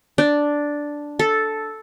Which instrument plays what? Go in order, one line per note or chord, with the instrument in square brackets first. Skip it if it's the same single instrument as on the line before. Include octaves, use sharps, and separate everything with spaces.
[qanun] D4
A4